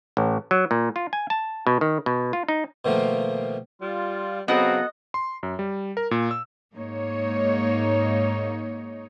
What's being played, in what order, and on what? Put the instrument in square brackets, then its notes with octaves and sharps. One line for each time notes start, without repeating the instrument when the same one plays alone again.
[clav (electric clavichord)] A1
F#3
A#2
F4
G#5
A5
B2
D#3
B2
F4
D#4
[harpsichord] B2 D#3 F3 A3 A#3
[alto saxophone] G3 [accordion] F4
[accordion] C#3 F#3 [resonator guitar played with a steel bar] B3 F#4 A4 [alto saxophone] C4 [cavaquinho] D#5
[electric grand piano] C6
F#2
G3
A#4
A#2
E6
[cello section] G#2 A#3 D#4 C#5